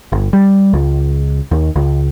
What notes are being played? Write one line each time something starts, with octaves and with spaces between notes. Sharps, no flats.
G1
G3
C#2
D#2
C#2